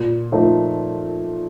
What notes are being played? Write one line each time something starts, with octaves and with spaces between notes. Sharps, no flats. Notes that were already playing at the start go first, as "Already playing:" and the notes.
Already playing: A#2
F3 A3 D#4 A#4